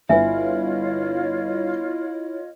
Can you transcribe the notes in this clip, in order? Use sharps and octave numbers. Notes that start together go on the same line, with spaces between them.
G1 E4 F4 B4 C#5 D#5 E5 G#5